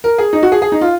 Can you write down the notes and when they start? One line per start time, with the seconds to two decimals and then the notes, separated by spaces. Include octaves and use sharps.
0.04 A#4
0.18 G#4
0.33 D#4
0.43 F#4
0.52 G#4
0.62 G#4
0.72 D#4
0.81 F4